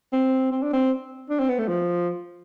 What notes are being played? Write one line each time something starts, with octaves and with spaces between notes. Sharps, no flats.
C4
C4
D4
C4
D4
C4
B3
A3
F3